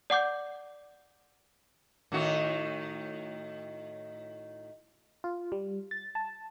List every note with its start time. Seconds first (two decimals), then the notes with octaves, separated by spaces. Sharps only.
0.10 D5 F#5 D6 G6
2.12 A2 D#3 F#4
5.24 F4
5.52 G3
5.91 A6
6.15 A5